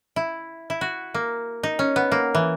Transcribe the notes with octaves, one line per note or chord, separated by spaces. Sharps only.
E4
E4
F#4
A#3
D#4
C#4
B3
A#3
E3